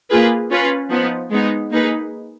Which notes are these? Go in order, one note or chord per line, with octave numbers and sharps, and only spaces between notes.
A#3 F4 G#4 B4
C#4 F4 B4
F3 B3 D#4
G#3 B3 D#4
A#3 D#4 G#4 B4